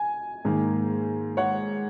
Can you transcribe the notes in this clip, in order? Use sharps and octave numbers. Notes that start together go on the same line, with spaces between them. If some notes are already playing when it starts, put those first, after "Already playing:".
Already playing: G#5
G#2 D#3 A#3
C#5 F#5